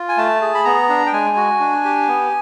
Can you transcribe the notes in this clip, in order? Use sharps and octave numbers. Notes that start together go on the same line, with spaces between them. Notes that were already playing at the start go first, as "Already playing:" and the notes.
Already playing: F4
G#5
A3 A5
G#4
B5
B3 A#5
D4
G5
G#3 G#5
F#4
D4
G4
B3